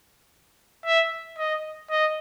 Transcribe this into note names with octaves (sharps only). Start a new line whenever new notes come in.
E5
D#5
D#5